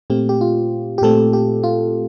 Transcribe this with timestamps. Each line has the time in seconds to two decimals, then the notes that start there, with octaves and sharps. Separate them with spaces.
0.10 A#2 A3 C4 G4
0.29 G4
0.41 F4
0.98 G4
1.02 A#2 A3 C4 A4
1.33 G4
1.64 F4